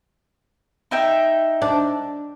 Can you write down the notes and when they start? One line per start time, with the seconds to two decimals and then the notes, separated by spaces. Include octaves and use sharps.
0.91 D#4 E5 G5
1.62 D4